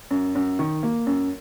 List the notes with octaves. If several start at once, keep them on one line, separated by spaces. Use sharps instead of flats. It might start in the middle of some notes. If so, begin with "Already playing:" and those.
F#2
F#2
D#3
A#3
F#2